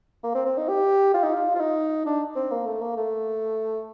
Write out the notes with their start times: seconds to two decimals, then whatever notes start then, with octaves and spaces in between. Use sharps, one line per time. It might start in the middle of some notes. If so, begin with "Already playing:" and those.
0.24 A#3
0.35 C4
0.46 C4
0.58 D#4
0.69 G4
1.14 F4
1.23 D#4
1.34 F4
1.55 F4
1.60 D#4
2.06 D4
2.35 C4
2.51 A#3
2.66 A3
2.81 A#3
2.97 A3